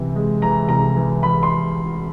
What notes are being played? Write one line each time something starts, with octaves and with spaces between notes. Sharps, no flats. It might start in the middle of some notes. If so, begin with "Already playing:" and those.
Already playing: C3 E3
G#3
E3 A#5
C2 A#5
E3
E3 B5
C6